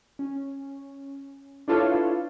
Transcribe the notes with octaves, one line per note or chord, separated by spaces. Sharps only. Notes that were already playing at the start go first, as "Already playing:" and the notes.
C#4
D4 E4 F4 A4 B4 C#5